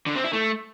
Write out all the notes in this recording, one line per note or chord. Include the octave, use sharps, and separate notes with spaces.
D3
C4
E4
A3